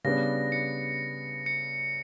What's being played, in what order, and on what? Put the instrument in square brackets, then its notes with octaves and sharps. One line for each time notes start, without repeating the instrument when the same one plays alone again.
[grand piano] C#3 G3 B3 D4 [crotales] A#6
[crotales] C#7
C#7